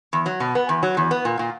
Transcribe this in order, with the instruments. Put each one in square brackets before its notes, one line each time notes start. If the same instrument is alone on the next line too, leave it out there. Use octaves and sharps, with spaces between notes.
[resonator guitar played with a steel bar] E2
F#3
B2
B3
E2
F#3
E2
B3
A#2
A#2